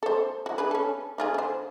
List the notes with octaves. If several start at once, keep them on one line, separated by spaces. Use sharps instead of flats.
A4 C5
E4 F#4
D4 G#4 B4
C#4 A4
D#4 F4 G#4
D3 C5